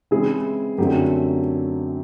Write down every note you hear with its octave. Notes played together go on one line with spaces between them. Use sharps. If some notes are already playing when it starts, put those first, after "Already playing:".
C#3 E3 G#3 C4 E4 G#4
F#2 D3 F#3 A3 C4 G4